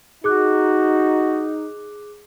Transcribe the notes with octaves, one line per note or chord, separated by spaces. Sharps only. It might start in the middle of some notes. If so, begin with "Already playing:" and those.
D#4 F#4 G#4 D6 F#6